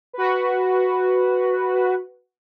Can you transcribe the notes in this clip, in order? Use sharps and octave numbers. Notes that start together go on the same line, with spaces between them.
F#4 B4